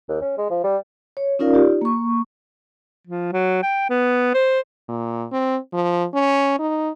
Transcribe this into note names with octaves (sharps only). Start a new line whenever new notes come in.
D#2
C#4
G#3
F3
G3
C#5
C#4 D#4 F4 A#4 D5 F5
D#4 F4 G4 D5
A#3 C#6
F3
F#3
G5
B3
C5
A#2
C4
F3
C#4
D#4